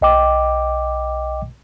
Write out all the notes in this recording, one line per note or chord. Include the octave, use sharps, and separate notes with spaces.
B1 D#5 G5 D6